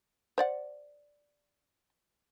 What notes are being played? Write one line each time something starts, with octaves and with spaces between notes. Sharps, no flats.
C5 D5 F#5